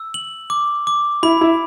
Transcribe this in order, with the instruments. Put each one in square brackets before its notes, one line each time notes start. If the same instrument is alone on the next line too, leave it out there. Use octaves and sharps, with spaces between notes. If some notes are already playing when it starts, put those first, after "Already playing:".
Already playing: [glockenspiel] E6
F#7
D6
D6
[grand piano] E4 [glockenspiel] B5
[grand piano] E4